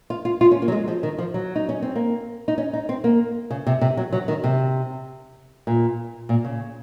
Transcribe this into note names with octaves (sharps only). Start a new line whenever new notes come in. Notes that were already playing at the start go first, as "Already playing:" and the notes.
F4
F4
F4
C#4
A#3
F#3
G#3
F3
D#3
F3
F#3
D#4
C#4
C4
A#3
D#4
C#4
D#4
C4
A#3
C#3
C3
C3
F#3
F#3
D#3
C3
A#2
A#2
C#3